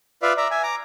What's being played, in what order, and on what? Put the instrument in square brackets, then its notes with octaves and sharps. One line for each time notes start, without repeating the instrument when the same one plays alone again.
[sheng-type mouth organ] F4 B4 D5 E5 F5
D5 E5 A#5
E5 G#5
A#5 D6